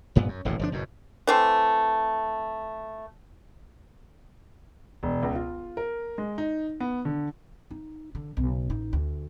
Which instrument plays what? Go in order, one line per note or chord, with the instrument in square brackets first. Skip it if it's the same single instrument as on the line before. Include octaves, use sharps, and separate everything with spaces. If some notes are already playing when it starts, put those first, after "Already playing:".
[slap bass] F1 G2 A#2 B3
F#2
D#1 A1 F#2 A2
G1 F3 D4
F#1 F#2 B2
[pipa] E3 A3 C4
[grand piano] E1
C#2
F4
A#4
G#3
D#4
B3
D3
[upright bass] D#4
D3
B1 C#3
A1 D#4
D2